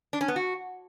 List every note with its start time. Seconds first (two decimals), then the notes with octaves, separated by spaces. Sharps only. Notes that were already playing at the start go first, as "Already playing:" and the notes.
0.13 D4
0.21 C#4
0.28 B3
0.36 F#4